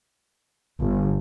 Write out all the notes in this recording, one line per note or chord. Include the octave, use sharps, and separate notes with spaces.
G1